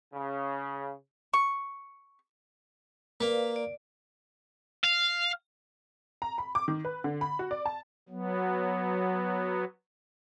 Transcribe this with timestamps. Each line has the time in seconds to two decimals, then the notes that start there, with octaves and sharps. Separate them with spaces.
0.13 C#3
1.33 C#6
3.21 A#3 B4 D5 F5
3.56 D5
4.84 F5
6.22 A#5
6.38 B5
6.55 D6
6.68 D#3
6.85 B4
7.04 D3
7.21 B5
7.39 F#4
7.51 D5
7.66 A5
8.09 F#3 B3